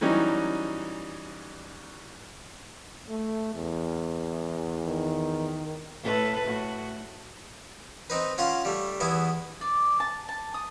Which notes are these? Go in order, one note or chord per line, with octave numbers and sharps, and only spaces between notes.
E3 F#3 G3 C#4 D#4
A3
E2
D#3
A2 A4 B4
A2 F#4
C4 D#4 B4
C#4 F4 F5 F#5 C6
G3 A3
E2 B3 E4 G#4
D5
A5
A5
D#6